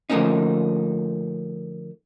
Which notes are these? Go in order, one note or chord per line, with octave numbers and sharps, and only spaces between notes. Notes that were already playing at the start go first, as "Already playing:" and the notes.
D3 F3 A3 A#3 C#4 D#4